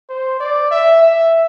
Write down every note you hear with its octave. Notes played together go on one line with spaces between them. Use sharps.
C5
D5
E5
E5